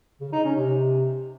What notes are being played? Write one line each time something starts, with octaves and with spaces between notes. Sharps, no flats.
C#3
D#4
C#4
C3